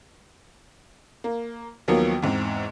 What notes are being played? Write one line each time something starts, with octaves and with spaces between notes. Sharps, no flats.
A#3
D#2 F3 F#3 A#3 B3
E2 G#2 C4